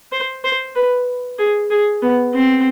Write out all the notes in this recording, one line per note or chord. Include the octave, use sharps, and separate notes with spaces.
C5
C5
B4
G#4
G#4
B3
C4